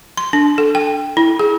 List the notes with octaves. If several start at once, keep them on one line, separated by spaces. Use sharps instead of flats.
C6
D4
A4
G5
E4
G#4